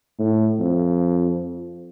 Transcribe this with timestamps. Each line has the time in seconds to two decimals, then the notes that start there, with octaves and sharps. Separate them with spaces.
0.19 A2
0.59 F2